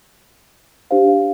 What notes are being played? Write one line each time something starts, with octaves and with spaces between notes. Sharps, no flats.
D4 G4 C5 F5